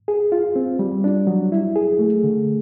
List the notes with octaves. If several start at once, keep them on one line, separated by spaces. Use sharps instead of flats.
G#4
F4
C4
G3
D4
F#3
E4
G#4
A3
D3